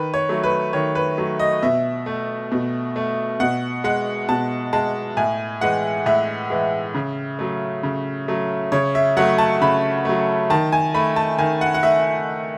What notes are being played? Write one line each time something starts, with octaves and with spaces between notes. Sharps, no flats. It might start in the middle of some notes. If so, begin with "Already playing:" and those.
Already playing: D#3 B4
C#5
F#3 A3
B4
D#3 C#5
B4
F#3 A3
D#5
B2 E5
A3
B2
A3
B2 F#5
G#3 F#5
B2 A5
G#3 A5
A2 G#5
E3 G#3 F#5
A2 E5
E3 G#3
C#3
F#3 A3
C#3
F#3 A3
C#3 C#5
E5
F#3 A3 F#5
A5
C#3 B5
F#3 A3
D#3 A5
G#5
A3 B5
A5
D#3 G#5
F#5
F#5
A3 E5